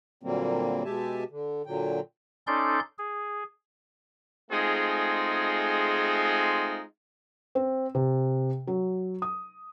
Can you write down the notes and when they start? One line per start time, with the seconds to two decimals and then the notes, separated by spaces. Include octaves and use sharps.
0.23 A#2 D3 F#3 G3 A#3 C4
0.85 B2 G#3 G4 E5 G#5 A5
1.31 D3
1.66 A#2 D3 F#3 G5
2.47 C#4 D#4 A4 D5 C6 G6
2.98 G#4
4.51 G#3 A3 C4 D#4 F4 G#4
7.55 C4
7.95 C3
8.67 F#3
9.22 D#6